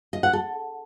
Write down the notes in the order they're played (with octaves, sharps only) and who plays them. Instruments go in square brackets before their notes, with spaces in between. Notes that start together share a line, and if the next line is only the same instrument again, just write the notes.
[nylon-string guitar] D#5
F#5
A4